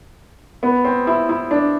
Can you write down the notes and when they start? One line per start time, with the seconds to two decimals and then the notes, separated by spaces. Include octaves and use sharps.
0.63 B3
0.85 C4
1.07 E4
1.29 E4
1.51 D4